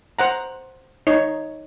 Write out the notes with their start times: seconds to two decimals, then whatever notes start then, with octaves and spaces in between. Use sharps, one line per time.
0.19 C5 F#5 A#5
1.07 D#4 C#5